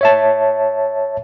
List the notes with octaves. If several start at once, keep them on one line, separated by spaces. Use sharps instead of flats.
C#5 E5 A5